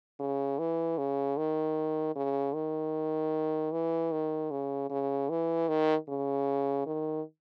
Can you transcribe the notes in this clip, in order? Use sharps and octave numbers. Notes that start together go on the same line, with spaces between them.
C#3
E3
C#3
D#3
C#3
D#3
E3
D#3
C#3
C#3
E3
D#3
C#3
D#3